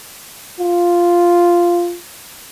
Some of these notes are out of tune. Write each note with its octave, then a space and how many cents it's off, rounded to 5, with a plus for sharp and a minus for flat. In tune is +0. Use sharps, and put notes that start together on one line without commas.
F4 -5